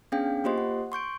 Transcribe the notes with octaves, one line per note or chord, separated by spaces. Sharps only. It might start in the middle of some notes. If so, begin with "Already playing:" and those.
B3 C#4 D4 G#4 F5 G5
A#3 F4 G4 C5 D#5 C6
F#5
C6 C#6 G6 D7